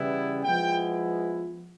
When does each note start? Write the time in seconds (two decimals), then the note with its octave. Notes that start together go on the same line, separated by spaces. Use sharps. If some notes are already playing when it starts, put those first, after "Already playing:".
Already playing: C#3 E3 G3 B3 E4
0.44 F3 G#3 B3 E4 G5